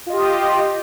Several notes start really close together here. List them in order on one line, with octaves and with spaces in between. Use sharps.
F4 D#5 G4